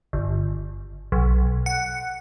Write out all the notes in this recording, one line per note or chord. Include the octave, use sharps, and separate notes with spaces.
G1
B1
F#5